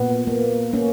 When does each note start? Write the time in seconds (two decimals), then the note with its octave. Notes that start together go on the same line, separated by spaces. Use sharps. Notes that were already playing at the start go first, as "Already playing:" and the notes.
Already playing: A#2 B3
0.27 A#3
0.73 A#3 C#4